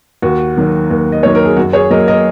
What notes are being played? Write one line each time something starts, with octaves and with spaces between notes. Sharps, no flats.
D#2 F#4
D#3 F#3 A#3
D#2
D#5
D#3 F#3 A#3 C#5
A#4
G#4
F#2 F#4
G#4 C#5
F#3 A#3 A#4 D#5
A#4 D#5